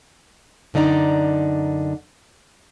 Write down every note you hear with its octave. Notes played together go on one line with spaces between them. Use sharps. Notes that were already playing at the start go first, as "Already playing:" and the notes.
F#2 D3 D#4 D5 A#5